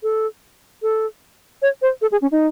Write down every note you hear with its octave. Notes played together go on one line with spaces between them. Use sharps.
A4
A4
C#5
C5
A4
G#4
C#4
D#4